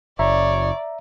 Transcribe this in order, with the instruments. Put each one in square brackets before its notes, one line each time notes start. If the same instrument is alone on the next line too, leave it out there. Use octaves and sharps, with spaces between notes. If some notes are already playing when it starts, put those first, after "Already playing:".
[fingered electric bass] F#1 [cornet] C#5 [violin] D5 [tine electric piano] E5 A#5